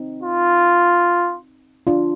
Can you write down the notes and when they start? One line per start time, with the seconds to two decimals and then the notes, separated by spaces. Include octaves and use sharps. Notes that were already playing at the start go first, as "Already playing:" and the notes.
Already playing: C4 D#4
0.24 F4
1.87 D4 F4